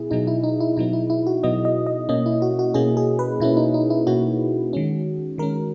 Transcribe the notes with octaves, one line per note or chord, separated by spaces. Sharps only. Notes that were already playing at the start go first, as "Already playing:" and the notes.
Already playing: B2 B3 E4 G#4
B2 F#3 B3 D#4
E4
D#4
E4
B2 F#3 B3 D#4
E4
E4
F#4
B2 F#3 B3 D#5
D#5
D#5
B2 A#3 C#4 D#5
E4
F#4
F#4
B2 A#3 C#4 G#4
G#4
B4
B2 A#3 C#4 E4
D#4
D#4
E4
B2 A#3 C#4 F#4
D#3 G#3 C#4
D#3 G#3 C#4 A#4